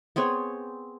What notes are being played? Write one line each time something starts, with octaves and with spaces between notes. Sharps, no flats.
B3 C4 G#4 C#5